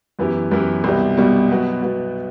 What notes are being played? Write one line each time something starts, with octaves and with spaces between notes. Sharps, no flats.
F#2 E3 B3 E4 G4
F#2 E3 B3 E4 G4
C2 B2 G3
C2 B2 G3
B2 F#3 B3 F#4
B2 F#3 B3 F#4